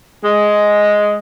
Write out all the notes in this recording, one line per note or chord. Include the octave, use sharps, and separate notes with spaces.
G#3